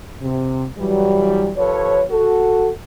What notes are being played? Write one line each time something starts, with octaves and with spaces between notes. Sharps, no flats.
C3
E3 F#3 G3
F3 G4 A4 B4 C#5
F#4 A4